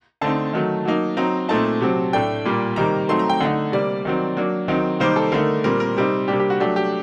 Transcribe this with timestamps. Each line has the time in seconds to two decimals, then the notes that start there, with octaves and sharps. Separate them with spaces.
0.21 D3 A3 C4 D#4 A5
0.53 D#3 F#3 A3
0.85 F#3 A#3 D#4
1.17 F#3 C4 D#4 A#5
1.49 A#2 A3 C4 D#4 A5
1.81 C3 F#3 C4
2.13 A2 A3 D4 G5
2.45 A#2 G3 A#3
2.76 C3 D#3 G3 A#3 A#5
3.09 F#3 A3 C4 D#4 C6
3.19 A#5
3.30 G5
3.40 D3 A3 D#4 F#5
3.72 C3 G3 A#3 D5
4.05 D#3 F#3 C4
4.37 F#3 A#3 D4
4.68 D#3 F#3 C4 D#4
5.00 C3 D#3 G3 A#3 D#4 C5
5.16 A4
5.32 D3 A3 D#4 A#4
5.64 A#2 G3 C4 A#4
5.80 A#4
5.97 C3 G3 C4 D#4
6.28 C3 G3 A#3 D4 G4
6.39 G4
6.50 F#4
6.60 F#3 A3 D4 G4
6.76 G4